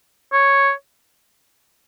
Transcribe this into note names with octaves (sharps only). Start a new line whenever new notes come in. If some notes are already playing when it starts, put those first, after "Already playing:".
C#5